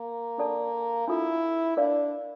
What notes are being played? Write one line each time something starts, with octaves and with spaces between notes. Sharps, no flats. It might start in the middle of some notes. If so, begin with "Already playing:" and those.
Already playing: A#3
D4 A4 D5 A5
D4 E4 F4 A4
D4 A#4 D5 F5